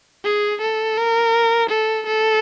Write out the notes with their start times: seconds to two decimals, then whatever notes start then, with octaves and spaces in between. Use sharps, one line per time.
0.25 G#4
0.62 A4
0.98 A#4
1.70 A4
2.07 A4